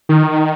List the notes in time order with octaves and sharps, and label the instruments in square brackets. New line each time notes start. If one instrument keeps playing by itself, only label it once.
[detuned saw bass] D#3